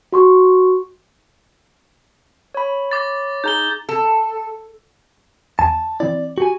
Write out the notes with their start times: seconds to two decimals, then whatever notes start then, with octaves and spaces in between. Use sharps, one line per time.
0.13 F#4 C6 C#6
2.54 C#5 B5
2.91 D6 A6
3.44 D#4 G#4 A#5 G6 G7
3.89 A4
5.59 E2 G#5 A5
6.00 E3 C4 E4 D5
6.38 F#4 G4 G#5